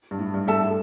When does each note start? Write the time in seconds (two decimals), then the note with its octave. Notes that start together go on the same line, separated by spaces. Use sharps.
0.11 G2
0.19 A2
0.34 G2
0.47 G2 A4 E5 A5
0.62 A2